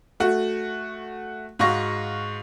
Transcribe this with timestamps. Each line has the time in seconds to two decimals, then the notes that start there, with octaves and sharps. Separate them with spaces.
0.20 A3 F#4
1.59 G#2 F#4 F5 C#6 A#6